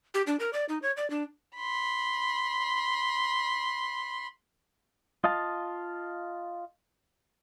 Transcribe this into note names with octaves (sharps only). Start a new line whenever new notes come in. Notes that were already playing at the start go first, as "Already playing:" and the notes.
G4
D4
A#4
D5
D#4
C#5
D5
D4
B5 C6
F4 D#5 F5 A5